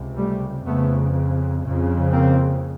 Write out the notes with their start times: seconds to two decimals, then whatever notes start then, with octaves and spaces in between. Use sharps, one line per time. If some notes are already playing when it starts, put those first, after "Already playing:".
Already playing: C#2 C3
0.17 G3 A3
0.66 F2 C#3 A3 B3
1.63 F2 C#3
2.12 A#3 C4